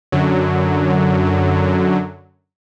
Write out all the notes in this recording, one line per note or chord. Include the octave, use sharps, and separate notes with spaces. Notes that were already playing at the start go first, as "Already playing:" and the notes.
F#2 D3 F#3